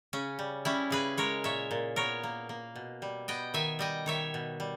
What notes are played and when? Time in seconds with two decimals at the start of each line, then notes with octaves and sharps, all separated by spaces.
0.13 C#3 C#4
0.39 G3
0.65 G3 C#4 E4
0.90 C#3 G#4 B4
1.17 G#3 A#4 C#5
1.44 A#2 C#5 E5
1.71 A#2
1.96 B3 A#4 C#5
2.24 A#3
2.49 A#3
2.76 B2
3.02 G3
3.28 B3 D#5 G5
3.54 D#3 E5 G#5
3.79 G3 D#5 G5
4.06 D#3 C#5 E5
4.34 B2
4.60 G3